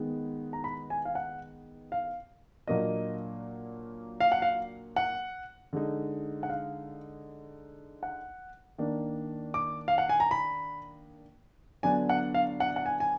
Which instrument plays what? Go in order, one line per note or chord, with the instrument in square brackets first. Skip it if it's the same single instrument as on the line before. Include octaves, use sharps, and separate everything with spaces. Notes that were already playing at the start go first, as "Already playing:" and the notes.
Already playing: [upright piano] D#3 G#3 B3 D#4
[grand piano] A#5
B5
G#5
F5
F#5
F5
[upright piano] A#2 F#3 A#3 D4 [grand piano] D#5
[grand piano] F5
F#5
F5
F#5
[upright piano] D3 G#3 D#4
[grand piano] F#5
F5
F#5
[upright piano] D#3 A#3 D4
[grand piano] D6
F5
F#5
G#5
A#5
B5
[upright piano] D3 F#3 B3 D4 [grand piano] G#5
[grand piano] F#5
F5
F#5
F#5
G#5
G#5